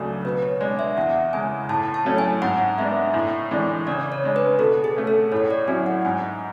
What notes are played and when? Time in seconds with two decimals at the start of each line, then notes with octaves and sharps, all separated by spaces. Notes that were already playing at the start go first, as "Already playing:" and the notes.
Already playing: C#2 C#3 F#3 A3 D4
0.25 B2 B4
0.42 C#5
0.61 G#3 D5
0.64 D4
0.79 E5
0.96 E2 F#5
1.33 C#3 G#3 G#5
1.69 A2 A5
1.94 A5
2.05 F#3 A3 C#4
2.18 G#5
2.42 G#2 F#5
2.78 G#3 B3 D4 E5
3.14 A2
3.51 E3 G#3 D4
3.87 C#3 D5
4.12 C#5
4.23 G#3 D4
4.36 B4
4.59 B2 A4
4.84 G#4
4.96 A3 C#4
5.07 A4
5.32 A2 C#5
5.50 D5
5.68 F#3 C#4 E4 G#5
5.86 F#5
6.05 G#2 G#5